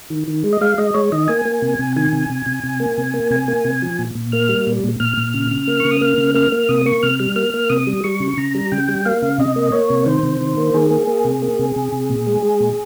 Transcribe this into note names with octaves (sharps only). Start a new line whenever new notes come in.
D#3
D#3
G#3
D#5
G#3 F5
G#3 D#5
G#3 C#5
D#3 D#5
A#3 G#5
A#3
C3
C3
D#3 G#5
C3
C3
C3
C3
A#3
C3
A#3
C3 G#5
A#3
C3
F3
A#2
A#2
A#3 F6
G3
A#2
A#2
A#2 F6
A#2
C#3
C#3
A#3
C#3 C#6
D#6
A#3 F6
C#3
A#3 F6
A#3
C3 D#6
A#3 C#6
C3 F6
G3 F6
A#3 F6
A#3
C3 D#6
G3
G3 C#6
C#3
C#3 A#5
G3
C#3 G5
G3
A#3 F5
C#3
C3 D#5
A#3
A#3 C#5
C3
D#3 C5
C3
D#3
A#3
D#3 G#4
A#3
A#3
C3
A#3
C3
C3
C3
A#2
G#3
G#3
A#2